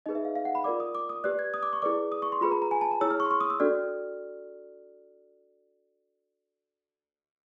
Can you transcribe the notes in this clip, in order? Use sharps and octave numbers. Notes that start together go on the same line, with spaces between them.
D#4 G#4 B4 D#5
E5
F5
F5
F#5
B5
F4 A#4 D5 D6
D#6
D6
D#6
G4 B4 D5 F#6
G#6
D#6
D6
C#6
E4 G#4 B4 D5 D6
D#6
C#6
C6
F4 G#4 B4 B5
A#5
A#5
G#5
A5
A#5
E4 G#4 C#5 E6
F6
C#6
C6
C#6
D#6
E6
D4 F#4 A4 D5 F6